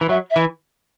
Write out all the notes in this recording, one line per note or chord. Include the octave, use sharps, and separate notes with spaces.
E3
F#3 E5
E5
E3